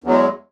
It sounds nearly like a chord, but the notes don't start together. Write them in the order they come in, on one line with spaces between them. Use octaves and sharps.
E2 F#3 G#3